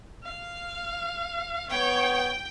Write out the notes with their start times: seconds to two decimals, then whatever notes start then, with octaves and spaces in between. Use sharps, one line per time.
0.23 F5
1.70 B3 C#5 G5